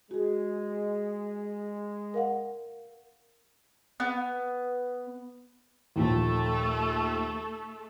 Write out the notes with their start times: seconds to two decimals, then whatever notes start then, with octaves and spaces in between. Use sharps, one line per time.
0.11 G#3 F#4 G#4
2.14 A#4 F5 F#5
4.00 B3
5.96 D#2 A#2 F3 A3 A4